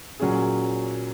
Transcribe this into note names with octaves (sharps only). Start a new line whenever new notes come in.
A#2 F#3 C#4 G#4